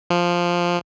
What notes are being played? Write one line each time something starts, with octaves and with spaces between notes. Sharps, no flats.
F3